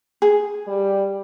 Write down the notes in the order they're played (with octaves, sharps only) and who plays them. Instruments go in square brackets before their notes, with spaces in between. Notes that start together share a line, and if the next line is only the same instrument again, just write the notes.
[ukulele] G#4
[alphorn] G3